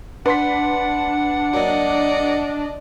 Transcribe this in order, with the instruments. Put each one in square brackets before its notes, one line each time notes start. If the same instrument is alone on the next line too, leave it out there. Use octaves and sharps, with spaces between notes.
[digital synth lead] D4 [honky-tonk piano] B4 C6 B6 [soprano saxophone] F#5
[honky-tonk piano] F#3 A#3 F#4 [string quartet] D5 D#5